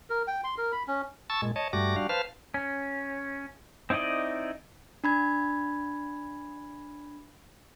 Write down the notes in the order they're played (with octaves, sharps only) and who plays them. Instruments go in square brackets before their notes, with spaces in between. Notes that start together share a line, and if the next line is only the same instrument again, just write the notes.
[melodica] A#4
G5
C6
A#4
B5
C#4
[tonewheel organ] A5 C#6 E6 A6
A#2 G#3
C#5 D#5 A5
G2 G3 A3 F#4 D6 A#6
G3 D4 F#4 F5
B4 C5 F5 A5 F6
[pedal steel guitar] C#4
C4 D#4 E4 D5 D#5
[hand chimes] D4 B5 G#6